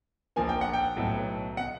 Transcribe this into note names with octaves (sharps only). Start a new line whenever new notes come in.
A#1 A#2 F3 A#3 G#5
G5
F#5
G5
B1 A2 F#3 B3
B2 F#5